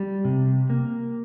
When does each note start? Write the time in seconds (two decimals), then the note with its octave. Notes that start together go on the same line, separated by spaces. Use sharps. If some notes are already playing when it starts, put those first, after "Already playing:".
Already playing: G3
0.25 C3
0.70 A#3